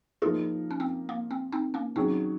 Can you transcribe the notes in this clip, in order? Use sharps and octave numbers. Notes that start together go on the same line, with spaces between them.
F3 A#3 D#4 F4 G#4 A#4
C#4
C4
A#3
C4
C4 D#4
A#3 C#4
D#3 F#3 C4 C#4 G#4